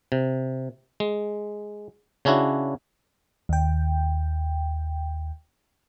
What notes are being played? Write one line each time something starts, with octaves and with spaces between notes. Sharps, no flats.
C3
G#3
C#3 C#4 D4 E4 F#4
D#2 G5